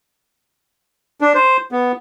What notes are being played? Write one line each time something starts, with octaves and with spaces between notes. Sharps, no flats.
D4
C5
B3